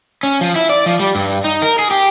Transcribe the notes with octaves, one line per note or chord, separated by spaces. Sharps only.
C#4
F3
E4
D5
F3
G3
G2
D#4
A#4
G#4
G4